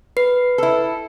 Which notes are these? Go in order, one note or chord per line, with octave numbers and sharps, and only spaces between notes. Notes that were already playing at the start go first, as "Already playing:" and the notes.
B4
E4 A4